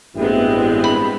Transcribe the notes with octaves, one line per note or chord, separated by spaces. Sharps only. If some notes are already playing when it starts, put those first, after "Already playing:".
A1 G2 G#3 B3 C4 E4 G5
B5